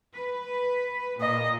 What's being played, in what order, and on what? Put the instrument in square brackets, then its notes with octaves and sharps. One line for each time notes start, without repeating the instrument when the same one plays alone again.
[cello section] B4
[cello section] A#2 [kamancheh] D#5